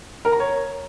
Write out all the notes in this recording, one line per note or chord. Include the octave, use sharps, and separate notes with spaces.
A#4
A#5
C#5